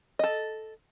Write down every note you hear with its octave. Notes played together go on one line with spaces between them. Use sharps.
A4 D#5